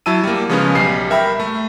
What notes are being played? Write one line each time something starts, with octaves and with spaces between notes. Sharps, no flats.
F#3 E4 A5 E6 D#7
G3 A#3
C#3 F3 G#3 B3 C#4
B1 G3 C7
A#4 E5 G5 B5
A3